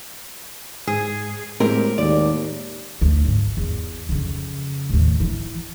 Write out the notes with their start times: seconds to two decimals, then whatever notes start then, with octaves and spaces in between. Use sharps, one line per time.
0.87 G#2 G#4
1.60 A2 G#3 A#3 C4 G4 A#4
1.98 D#2 D5
3.01 D2
3.25 G#1
3.57 E2
4.09 F2 C#3
4.89 D#2 A2
5.20 E3